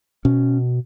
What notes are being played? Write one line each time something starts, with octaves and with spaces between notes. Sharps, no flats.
B2 C#4